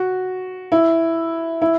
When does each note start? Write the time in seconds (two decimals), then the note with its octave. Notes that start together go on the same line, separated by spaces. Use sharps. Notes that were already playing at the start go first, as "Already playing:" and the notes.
Already playing: F#4
0.72 E4
1.62 E4